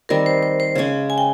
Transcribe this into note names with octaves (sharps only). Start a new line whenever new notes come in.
D#3 G3 C4 A#4
C5
C5
C5
C#3 G#3 C#4
G#5
G5